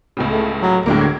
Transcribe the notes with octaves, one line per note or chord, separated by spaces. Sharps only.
C#2 A2 C#3
A3
F#3
D2 A2 G#3 A#3
G#6